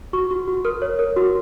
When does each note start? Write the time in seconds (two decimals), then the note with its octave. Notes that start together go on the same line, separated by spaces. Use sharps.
0.13 F#4 C#6
0.31 F#4
0.47 F#4
0.65 A#4 F6
0.82 C#5
0.99 A#4
1.17 F#4